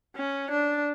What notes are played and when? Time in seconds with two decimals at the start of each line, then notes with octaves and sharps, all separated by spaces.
0.16 C#4
0.51 D4